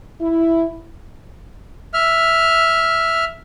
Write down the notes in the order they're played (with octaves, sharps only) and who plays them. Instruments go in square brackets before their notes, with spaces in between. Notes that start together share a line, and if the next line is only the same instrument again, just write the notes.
[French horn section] E4
[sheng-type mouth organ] E5 F6